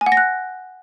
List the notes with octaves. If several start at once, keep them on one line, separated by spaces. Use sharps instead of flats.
G#5
F#5
A#6
F#6